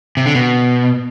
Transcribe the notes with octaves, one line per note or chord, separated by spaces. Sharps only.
C3
D3
B2